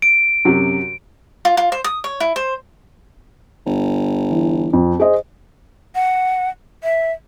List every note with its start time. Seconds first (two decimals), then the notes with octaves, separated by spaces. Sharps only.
0.02 D7
0.45 F#2 C3
1.45 F4
1.57 F4
1.72 C5
1.84 D#6
2.04 C#5
2.20 E4
2.36 C5
3.66 G1
4.31 E3
4.73 F2
5.00 G#4 C5 D#5
5.95 F#5
6.83 E5